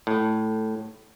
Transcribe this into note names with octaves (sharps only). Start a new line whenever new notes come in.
A2